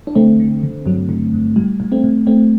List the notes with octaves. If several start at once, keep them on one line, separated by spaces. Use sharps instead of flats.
D4
D3 A3 C4
D3
D3
G2 F#3
D3
G2
A2 G3
A2
A3 C4
A2
A2 A3 C4